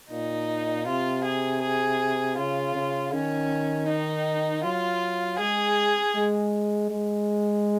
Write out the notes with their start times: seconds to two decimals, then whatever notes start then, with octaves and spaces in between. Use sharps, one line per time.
0.10 A#2 D#4
0.86 C3 F4
1.24 G#4
1.62 G#4
2.38 C#3 F4
2.75 C#3
3.13 D#3 C#4
3.88 D#4
4.64 F#3 F4
5.39 G#3 G#4
6.15 G#3
6.90 G#3